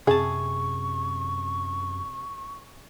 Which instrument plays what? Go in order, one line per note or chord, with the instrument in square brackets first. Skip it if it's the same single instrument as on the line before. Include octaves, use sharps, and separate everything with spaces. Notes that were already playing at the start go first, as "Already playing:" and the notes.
[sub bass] F#2 [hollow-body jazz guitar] C3 A5 [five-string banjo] G#4 [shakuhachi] C#6